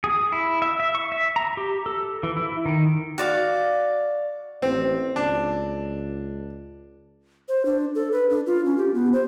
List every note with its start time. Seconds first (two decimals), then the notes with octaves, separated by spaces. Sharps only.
0.04 G#4
0.32 E4
0.62 E5
0.80 E5
0.95 C#6
1.12 E5
1.36 A#5
1.57 G4
1.86 A4
2.23 E3
2.37 E4
2.66 D#3
3.18 F#4 D5 F5
4.62 A1 C4
5.16 C#2 D4
7.49 C5
7.65 D4
7.95 A4
8.12 B4
8.30 D4
8.46 F4
8.65 C#4
8.78 G4
8.94 B3
9.13 C5